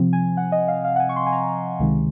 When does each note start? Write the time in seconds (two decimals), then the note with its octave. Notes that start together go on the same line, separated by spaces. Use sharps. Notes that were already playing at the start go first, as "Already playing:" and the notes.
Already playing: C3 F3 C4
0.13 G#5
0.37 F#5
0.52 D#5
0.68 F5
0.84 F5
0.96 F#5
1.00 G#5
1.09 C#6
1.16 C6
1.26 G#5
1.32 A#5
1.79 C#2 C3 D#3 G#3